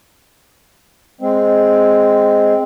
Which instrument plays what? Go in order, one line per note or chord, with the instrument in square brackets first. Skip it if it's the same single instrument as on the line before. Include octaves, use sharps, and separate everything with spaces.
[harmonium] G#3 C4